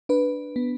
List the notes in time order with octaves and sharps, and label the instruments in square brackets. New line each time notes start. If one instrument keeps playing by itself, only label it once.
[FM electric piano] D4 B4
B3